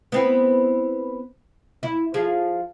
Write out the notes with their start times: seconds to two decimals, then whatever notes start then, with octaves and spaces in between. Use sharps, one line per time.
0.12 B3 C4 E4
1.83 E4
2.14 F3 G#4